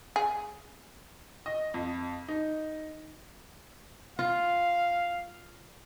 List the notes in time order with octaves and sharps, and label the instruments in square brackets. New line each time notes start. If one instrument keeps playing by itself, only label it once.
[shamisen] G#4
[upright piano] D#5
F2
D#4
[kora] F4 [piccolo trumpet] F5